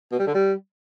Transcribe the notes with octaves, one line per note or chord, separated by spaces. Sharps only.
B2
G3
D3
G3